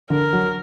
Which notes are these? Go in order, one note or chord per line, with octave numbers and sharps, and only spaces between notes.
D3 A#4
F#3